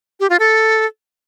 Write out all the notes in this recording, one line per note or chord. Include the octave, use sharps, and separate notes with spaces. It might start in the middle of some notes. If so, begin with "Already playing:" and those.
G4
F4
A4